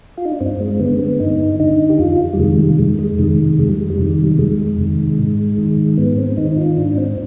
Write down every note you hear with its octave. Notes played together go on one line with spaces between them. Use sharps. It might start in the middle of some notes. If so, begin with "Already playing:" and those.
F4
D#4
D4
G2 C4
G#3
D3 B3
G#3
B3
G2 D#4
D3 D#4
G4
F2 F4
G3
C3 D#3 G#3
G3
F2 G#3
G#3
C3 D#3 G#3
F2 G#3
G3
G3
C3 D#3
G3
F2 G#3
C3 D#3
G#2
D#3
G#2 B3
C4
D#3 D#4
D#4
F4
G#2 D4
C4